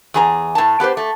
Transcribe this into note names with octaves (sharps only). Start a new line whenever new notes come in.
E2 G#4 A#5
A2 A5
B3 G4 B4 C5
A3